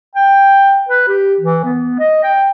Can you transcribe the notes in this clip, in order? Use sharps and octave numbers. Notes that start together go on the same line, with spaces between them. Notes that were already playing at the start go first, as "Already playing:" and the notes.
G5
B4
G4
E3
B3
D#5
G5